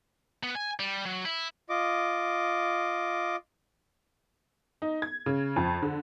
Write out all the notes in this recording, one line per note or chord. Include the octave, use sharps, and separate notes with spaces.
B3
G#5
G3
F#3
E4
F4 D#5 D6
D#4
G#6
C#3
F2
D3